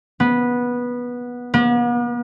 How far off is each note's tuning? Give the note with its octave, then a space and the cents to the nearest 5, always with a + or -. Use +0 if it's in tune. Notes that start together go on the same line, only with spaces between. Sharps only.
B3 -15
B3 -45